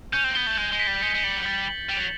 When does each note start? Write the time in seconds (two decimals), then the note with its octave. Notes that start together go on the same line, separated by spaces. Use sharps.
0.13 C#4 G6
0.24 C4
0.31 A#3
0.35 B3 G7
0.47 A3
0.58 G#3 G6
0.72 G#3
0.79 B6
0.87 G3
1.01 G#3 C#7
1.14 G#3
1.23 G3 F#7
1.37 F#3
1.45 G3 A6
1.68 F#7
1.89 G3 E7
1.97 F#3